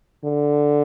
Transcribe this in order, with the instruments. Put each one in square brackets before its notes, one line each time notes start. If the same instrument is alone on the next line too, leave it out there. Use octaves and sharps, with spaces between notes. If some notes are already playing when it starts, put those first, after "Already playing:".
[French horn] D3